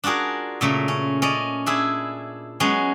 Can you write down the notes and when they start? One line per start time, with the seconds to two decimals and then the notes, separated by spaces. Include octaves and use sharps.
0.04 D4 F4 F#4 G#4 A#4
0.61 A#2 C#3 A3 A#4
0.88 C#4
1.22 C#4 D5 D#5
1.66 D4 E4 G#4
2.60 F#3 G#3 B3 C#4